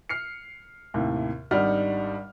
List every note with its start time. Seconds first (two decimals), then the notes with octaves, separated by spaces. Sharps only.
0.09 F6 C7 C#7
0.94 D#2 A2 C3
1.51 G#1 G3 D4 D#4 F#5 F6